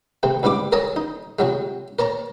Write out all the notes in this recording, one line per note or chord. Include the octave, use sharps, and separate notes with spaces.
C3 A3 C4
C#2 G#2 G3 E4 D6
A4 A#4 C#5 D#5 G#5 A5
D#4
C3 F3 F#3 G#3
A#4 C#5 A5 A#5